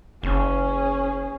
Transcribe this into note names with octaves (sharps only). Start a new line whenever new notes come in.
F#1 C#4 G#4